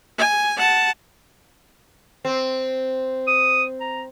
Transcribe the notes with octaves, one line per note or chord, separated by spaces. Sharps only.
G#5
F#5 A5
C4
D#6
A#5